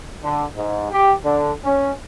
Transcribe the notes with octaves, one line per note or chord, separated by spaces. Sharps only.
D3
G#2
G4
D3
C#4